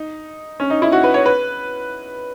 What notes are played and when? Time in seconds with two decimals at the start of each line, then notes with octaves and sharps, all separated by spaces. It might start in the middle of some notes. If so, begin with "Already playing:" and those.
Already playing: D#4
0.60 C#4
0.70 D#4
0.82 E4
0.92 F#4
1.04 B4
1.14 C#5
1.26 B4